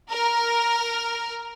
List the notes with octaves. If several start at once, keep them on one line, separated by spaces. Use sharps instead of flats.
A#4